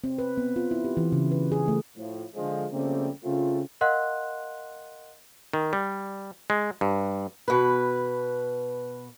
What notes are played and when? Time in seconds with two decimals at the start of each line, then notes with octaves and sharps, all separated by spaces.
0.04 C4
0.18 B4
0.38 B3
0.56 F4
0.71 E4
0.85 G4
0.97 E3
1.12 C#3
1.31 B4
1.52 G#4
1.68 A3
1.97 A2 F3
2.35 D3 F3 G#3
2.72 C#3 F3 G3 A3 A#3 C4
3.24 C#3 A3 C4 F4
3.81 A#4 D#5 F5 F#5 C6 F#6
5.53 D#3
5.73 G3
6.50 G#3
6.81 G2
7.48 B2 B4